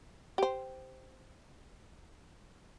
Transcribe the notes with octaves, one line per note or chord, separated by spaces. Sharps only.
G4 C5